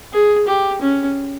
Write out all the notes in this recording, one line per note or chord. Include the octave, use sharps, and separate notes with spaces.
G#4
G4
C#4